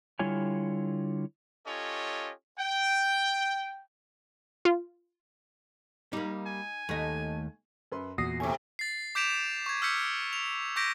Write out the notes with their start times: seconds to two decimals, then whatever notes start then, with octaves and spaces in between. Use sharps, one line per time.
0.19 D3 G3 E4 F4 C#5 G#5
1.66 C#4 F4 G4 A4 C#5 D#5
2.59 G5
4.65 F4
6.13 G3 A#3 D#4
6.46 G#5
6.89 D#2 A3 D#5
7.92 F#2 B4 C6
8.18 E2 A#2 F#4 D#6 A#6 C7
8.40 A2 C3 A3 G#5 C#6 D6
8.79 A6 C7
9.15 D6 G6 B6 D7 E7 F7
9.66 C#6 G#6
9.82 E6 F6 G6 B6 C#7
10.33 F7
10.76 C#6 D6 G6 A#6 B6 D7